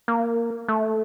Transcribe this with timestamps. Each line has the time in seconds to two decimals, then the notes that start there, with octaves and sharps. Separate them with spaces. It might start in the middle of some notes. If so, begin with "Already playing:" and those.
0.08 A#3
0.68 A3